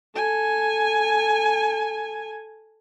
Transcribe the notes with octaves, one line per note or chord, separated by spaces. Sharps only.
A4 G#5